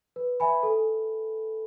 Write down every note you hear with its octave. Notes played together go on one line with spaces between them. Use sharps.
B4
E5 G#5 B5
A4